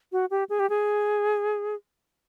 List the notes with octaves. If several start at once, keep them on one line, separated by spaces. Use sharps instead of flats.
F#4
G4
G#4
G4
G#4